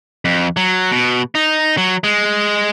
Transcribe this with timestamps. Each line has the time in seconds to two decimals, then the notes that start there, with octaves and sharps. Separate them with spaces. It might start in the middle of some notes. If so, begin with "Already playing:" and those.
0.25 F2
0.57 F#3
0.92 B2
1.35 D#4
1.77 F#3
2.04 G#3